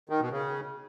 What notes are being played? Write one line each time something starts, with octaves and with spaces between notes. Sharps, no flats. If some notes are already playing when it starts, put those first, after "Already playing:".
D#3
B2
C#3